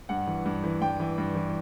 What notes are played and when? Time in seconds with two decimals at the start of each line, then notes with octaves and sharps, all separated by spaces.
0.09 G2 F#5
0.27 E3
0.46 G2
0.64 E3
0.81 G2 G5
1.00 E3
1.18 G2
1.35 E3